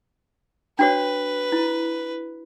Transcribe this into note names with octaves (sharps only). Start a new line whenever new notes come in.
D4 F#4 B4 C#5
E4